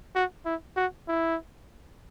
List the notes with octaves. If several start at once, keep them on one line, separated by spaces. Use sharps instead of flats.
F#4
E4
F#4
E4